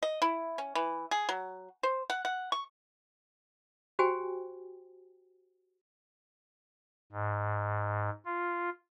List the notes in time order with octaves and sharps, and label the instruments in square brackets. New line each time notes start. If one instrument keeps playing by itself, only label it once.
[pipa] D#5
E4
C#4
E3
G#4
F#3
C5
F#5
F#5
C#6
[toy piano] F#4 G4 C5 G5 G#5
[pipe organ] G#2
F4